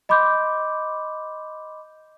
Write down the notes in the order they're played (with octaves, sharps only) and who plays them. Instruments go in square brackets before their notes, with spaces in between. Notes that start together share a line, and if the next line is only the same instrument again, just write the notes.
[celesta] D#5 B5 C6 D6 G6